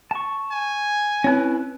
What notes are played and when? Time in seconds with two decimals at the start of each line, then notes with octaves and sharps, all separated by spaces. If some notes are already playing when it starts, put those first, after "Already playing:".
0.11 A5 C#6
0.51 G#5
1.24 C4 C#4 E4 B4 C#5